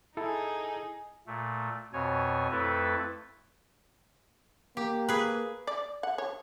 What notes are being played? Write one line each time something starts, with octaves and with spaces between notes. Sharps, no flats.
D#4 E4 G#4 A4
A#2 A3
F2 B2 C#5 G#5
F2 A3 E4 A4 B4
A#3 G4
G#4 B4
D5
F#5
C#5